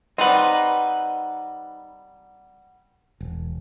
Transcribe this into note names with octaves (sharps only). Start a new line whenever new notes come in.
G3 C4 D#4 B4 F#5 A#5
E1